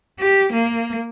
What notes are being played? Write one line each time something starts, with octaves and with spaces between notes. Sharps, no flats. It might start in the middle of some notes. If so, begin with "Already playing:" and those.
G4
A#3